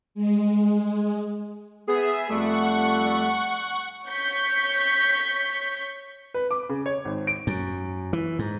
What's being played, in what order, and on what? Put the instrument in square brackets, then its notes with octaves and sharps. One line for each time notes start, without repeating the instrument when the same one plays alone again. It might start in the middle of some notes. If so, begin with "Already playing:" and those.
[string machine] G#3
[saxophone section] B3 G#4 [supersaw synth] E5
[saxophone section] F2 G3 A3 [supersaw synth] F#5 C#6
[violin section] C#5 C#6 G6 B6
[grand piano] B4
D6
C#3
C#5
G#1
D7
[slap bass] F#2
E3
G#2